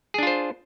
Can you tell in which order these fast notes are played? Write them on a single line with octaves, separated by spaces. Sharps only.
G#4 D4 F4 C5